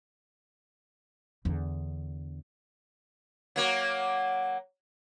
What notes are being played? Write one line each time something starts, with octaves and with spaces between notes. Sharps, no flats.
E2 D3
F#3 A#3 F#4